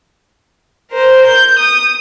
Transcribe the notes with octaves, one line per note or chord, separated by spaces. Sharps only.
A#4 C5
G6
D#6